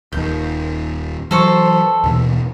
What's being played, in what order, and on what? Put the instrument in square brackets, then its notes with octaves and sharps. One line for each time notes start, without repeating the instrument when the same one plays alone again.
[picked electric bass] D#1 D#2 [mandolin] G6
[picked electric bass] E3 F#3 [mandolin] A4 C5 C#6
[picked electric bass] D#2 B2 E3